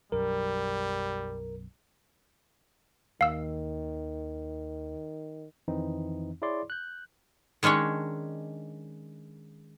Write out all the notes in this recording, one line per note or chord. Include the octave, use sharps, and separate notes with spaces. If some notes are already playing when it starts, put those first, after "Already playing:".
B1 F#2 G3 A#4
D#2 D#3 F5 E6
F2 D#3 E3 C4 D#4
E4 G#4 C#5 D5 C6 D6
F#6 G6
D#3 G#3 C#4 D4 C#5